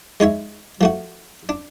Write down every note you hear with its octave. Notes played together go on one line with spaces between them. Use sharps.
G#3 D#4 C#5 E5
F3 A3 F#4
D4